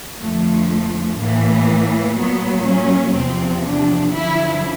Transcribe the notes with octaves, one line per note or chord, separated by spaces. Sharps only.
F2 D3 F3 A3
A2 E3 A#3
A#2 F#3 B3
C#4
E2 C3 F3 C4
D4
F#2 D3 F3 E4